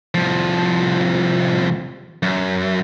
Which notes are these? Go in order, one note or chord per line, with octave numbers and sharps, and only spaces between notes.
C2 F3
F#2